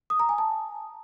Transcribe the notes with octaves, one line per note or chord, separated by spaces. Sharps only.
D#6
A#5
G#5
A5